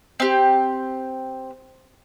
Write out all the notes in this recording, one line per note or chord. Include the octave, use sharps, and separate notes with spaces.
C4 G4